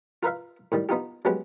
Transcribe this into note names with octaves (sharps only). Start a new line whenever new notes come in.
F4 A#4 B4 E5 F5
A2 D#3 G3
B3 D#4 F4 G4
F#3 G#3 B3 C#4 G4 B4